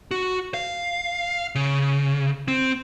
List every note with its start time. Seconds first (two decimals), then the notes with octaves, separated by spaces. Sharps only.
0.11 F#4
0.54 F5
1.55 C#3
2.48 C4